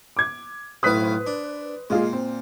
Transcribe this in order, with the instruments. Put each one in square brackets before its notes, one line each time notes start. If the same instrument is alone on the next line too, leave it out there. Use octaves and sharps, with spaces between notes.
[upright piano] D6 G#6
[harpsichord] B1 A2 F5 [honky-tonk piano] B4 C5 [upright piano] D#6 F#6 B6
[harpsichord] D4
[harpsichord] A#2 [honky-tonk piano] G#3 F4 G#4
[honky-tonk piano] C4